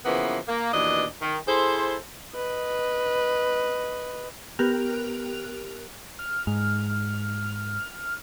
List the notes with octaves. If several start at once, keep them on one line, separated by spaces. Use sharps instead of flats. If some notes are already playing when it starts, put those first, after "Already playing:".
C#3 E3 F3 A#3 B3
A#3
D#2 B2 E3 D4 D#5
D#3
E4 G#4 A4 C5
B4 D#5
B3 G4 A#4 F6 F#6 F7
F6
G#2 F6